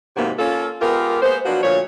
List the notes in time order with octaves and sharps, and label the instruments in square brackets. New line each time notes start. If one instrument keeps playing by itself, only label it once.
[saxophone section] E2 G#2 C3 F#3 A#3 B3
A#3 C#4 F4 A4
G#3 B3 F4 G4 A#4
G#3 A#3 B3 C5
F3 F#3 A#3 B3 D4 F#4
D2 A#2 F3 C#5